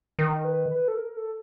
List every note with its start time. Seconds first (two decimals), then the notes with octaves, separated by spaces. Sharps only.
0.19 D#3 A#4
0.45 B4
0.71 B4
0.88 A4
0.97 A#4
1.17 A4